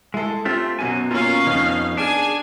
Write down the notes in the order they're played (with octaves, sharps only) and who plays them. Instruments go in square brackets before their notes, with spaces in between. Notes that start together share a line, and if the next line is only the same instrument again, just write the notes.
[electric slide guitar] G#3 [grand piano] E4 A4
[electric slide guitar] A3 F4 G4 [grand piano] C4
[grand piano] F#2 B2 [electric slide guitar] F#3 G#5
[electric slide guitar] A#3 F4 [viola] C#4 F5
[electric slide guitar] F2 D#3 [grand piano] B3 D#4
[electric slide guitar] D4 [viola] G#4 G#5